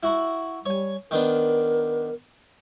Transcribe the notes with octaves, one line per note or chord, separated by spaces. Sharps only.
E4 F#4 B5
G3 C#5 G#5
D#3 B3 D4 A#4